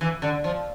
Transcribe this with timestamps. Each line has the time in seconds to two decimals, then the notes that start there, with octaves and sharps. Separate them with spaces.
0.01 E3
0.22 D3
0.44 F3